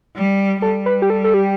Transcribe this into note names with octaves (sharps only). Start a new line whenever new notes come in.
G3
G3 A4
B4
G4
A4
A4
G4